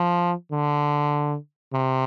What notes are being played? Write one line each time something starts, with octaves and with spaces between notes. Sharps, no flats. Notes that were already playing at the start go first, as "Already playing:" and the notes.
Already playing: F3
D3
C3